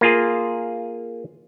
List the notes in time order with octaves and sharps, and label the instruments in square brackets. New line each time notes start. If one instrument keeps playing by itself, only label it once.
[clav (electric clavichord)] A#3 F4 G#4